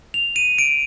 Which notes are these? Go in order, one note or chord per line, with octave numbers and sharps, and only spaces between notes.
F7
D#7
D7